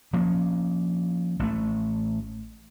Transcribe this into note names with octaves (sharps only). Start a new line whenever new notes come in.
F3 A#3 C#4
A1 A3